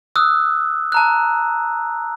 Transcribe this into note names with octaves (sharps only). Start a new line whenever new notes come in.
D#6 E6 F#6
A5 A#5 F#6